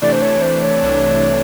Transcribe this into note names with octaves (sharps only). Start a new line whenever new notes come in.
C3 E3 A3 D4 D5
C5
C#5
C5
C#5
C2 C3 E3 A3 D4